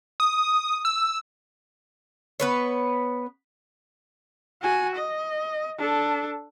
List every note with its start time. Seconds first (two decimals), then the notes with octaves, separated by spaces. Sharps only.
0.20 D#6
0.85 E6
2.40 B3 B4 C#5
4.62 F#4 G#5
4.96 D#5
5.78 D4 A4